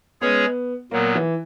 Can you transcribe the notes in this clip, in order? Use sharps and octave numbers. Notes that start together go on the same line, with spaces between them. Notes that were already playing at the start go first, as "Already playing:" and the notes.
G#3 B3 C#4 G#4 C#5
A#2 F#3 A#3 B3
E3